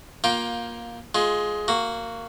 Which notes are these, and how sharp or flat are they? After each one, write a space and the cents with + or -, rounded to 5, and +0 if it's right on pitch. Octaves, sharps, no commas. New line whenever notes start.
A#3 +15 F4 +25 G5 -5
G#3 +15 F4 +20
A#3 -15 F#4 +0